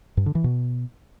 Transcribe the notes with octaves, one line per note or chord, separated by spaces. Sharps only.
G2
D3
E3
B2